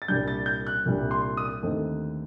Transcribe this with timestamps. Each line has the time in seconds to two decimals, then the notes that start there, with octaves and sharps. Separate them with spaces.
0.02 A6
0.08 C2 A#2 G3 D4 G6
0.28 A6
0.46 G6
0.67 F#6
0.86 C2 A#2 G3 D4
1.11 C6
1.37 D#6
1.63 D#2 D3 A3 C4 D#4